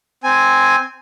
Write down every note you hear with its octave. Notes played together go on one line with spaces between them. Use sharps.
C4 G#5